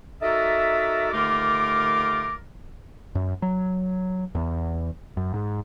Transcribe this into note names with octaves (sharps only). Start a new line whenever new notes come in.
D#4 F#4 A4 A#4 D5 E5
D#2 D3 A3 F4 A#4 D6
F#2
F#3
E2
F#2
G#2